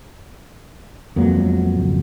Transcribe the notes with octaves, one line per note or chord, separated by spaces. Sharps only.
F2 F#3 G#3 A#3 B3
G#1 C#2